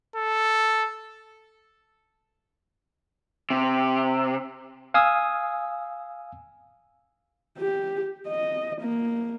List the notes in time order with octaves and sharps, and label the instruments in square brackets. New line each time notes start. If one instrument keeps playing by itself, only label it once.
[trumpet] A4
[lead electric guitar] C3
[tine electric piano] F5 G#5 D#6 E6
[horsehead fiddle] G4
D#5
A#3